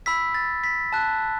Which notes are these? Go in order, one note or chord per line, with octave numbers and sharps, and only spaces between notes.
B5 E6 B6
A6
B6
A5 F#6